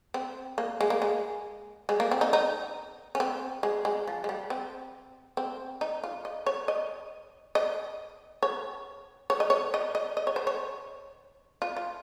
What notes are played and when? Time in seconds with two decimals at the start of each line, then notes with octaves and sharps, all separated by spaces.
0.14 C4
0.58 A#3
0.81 G#3
0.90 A#3
1.02 G#3
1.89 G#3
2.00 A#3
2.11 C4
2.21 D#4
2.33 D#4
3.15 C#4
3.20 C4
3.63 G#3
3.85 G#3
4.08 F3
4.24 G#3
4.29 G3
4.50 C4
5.37 C4
5.81 D#4
6.04 F4
6.25 D#5
6.46 C#5
6.68 D#5
7.55 D#5
8.43 C#5
9.30 C#5
9.40 D#5
9.50 C#5
9.74 D#5
9.95 D#5
10.17 D#5
10.27 C#5
10.36 C5
10.47 C#5
11.62 F4
11.76 F4